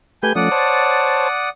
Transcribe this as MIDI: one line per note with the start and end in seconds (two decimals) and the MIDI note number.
0.23 0.33 57
0.23 0.33 67
0.23 0.33 71
0.23 0.32 80
0.23 0.32 91
0.36 0.49 53
0.36 0.49 57
0.36 0.49 61
0.36 1.49 74
0.36 1.49 78
0.36 1.49 87
0.51 1.28 72
0.51 1.28 73
0.51 1.28 81